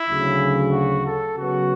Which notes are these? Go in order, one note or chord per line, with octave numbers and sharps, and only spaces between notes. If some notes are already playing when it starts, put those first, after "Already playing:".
Already playing: E4
D2 C#3 F#3
F#4
A4
C#3 F#3 B3 F#4